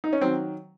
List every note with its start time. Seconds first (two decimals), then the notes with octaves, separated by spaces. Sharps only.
0.04 D#4
0.13 C#4
0.21 D#3 F#3 C4